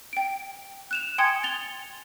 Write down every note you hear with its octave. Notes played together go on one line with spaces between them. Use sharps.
G5 D7
F#6 E7 F7
G5 G#5 C6 D#6 G#6 C#7
A6 F7 G7